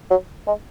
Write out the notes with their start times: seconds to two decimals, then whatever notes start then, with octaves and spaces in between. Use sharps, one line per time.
0.10 F#3
0.47 G#3